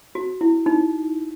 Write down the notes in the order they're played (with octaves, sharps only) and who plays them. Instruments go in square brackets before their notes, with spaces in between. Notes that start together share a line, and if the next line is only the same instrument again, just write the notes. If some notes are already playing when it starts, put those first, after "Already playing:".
[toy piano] F#4
E4
D#4